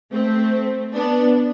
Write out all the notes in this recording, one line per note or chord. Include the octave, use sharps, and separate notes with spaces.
A3 C4
B3 D4